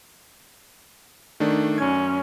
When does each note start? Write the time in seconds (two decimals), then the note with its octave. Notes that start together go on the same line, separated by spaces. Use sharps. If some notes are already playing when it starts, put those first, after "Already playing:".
1.40 D#3 A3 D4
1.78 F#2 C#4 G#6